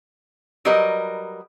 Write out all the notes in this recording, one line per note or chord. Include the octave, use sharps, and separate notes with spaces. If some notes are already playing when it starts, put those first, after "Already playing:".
F#3 G3 A#4 B4 D#5